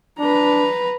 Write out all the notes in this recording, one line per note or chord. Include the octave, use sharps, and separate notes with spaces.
D4 B4 A#5